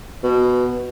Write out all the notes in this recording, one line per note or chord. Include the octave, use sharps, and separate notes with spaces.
B2